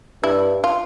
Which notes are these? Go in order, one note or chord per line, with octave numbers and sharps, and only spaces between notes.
G2 E4
F4